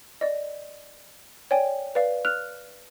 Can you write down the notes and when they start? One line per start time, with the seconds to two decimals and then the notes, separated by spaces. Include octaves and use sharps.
0.21 D5 D#5
1.51 C#5 D5 G5 G#5
1.95 B4 D5 F5
2.25 F6 F#6 F7